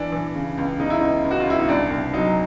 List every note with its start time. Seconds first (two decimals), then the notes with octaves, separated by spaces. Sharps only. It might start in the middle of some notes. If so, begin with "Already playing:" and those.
Already playing: E3 D4
0.12 E3
0.35 C#3
0.58 C#2
0.79 C#3 D#4
0.90 E4
1.00 C#2 D#4
1.24 C#2
1.31 F#4
1.40 F4
1.47 C#2 E4
1.59 D#4
1.69 C2 D4
1.90 C2
2.13 F#3 D#4